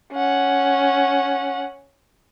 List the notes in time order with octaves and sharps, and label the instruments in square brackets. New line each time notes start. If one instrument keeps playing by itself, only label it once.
[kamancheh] C#4 F#5